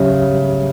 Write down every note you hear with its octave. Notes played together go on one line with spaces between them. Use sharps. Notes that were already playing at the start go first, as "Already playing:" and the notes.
Already playing: C#3 F#3 C#4 G4 C#5 E5